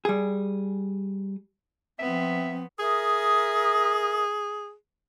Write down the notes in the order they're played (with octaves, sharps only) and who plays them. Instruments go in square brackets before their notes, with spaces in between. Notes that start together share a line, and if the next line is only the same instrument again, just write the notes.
[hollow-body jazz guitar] G3 G#4
[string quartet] F3 B3 [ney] C4 [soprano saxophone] E5
[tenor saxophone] G#4 [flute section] A#4 E5 D#6